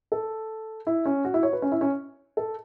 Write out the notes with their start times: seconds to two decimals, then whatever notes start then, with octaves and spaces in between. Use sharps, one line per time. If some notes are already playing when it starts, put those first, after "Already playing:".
0.12 A4
0.87 E4
1.06 C#4
1.25 F#4
1.34 E4
1.43 C#5
1.53 B4
1.62 C#4
1.72 E4
1.81 C#4
2.37 A4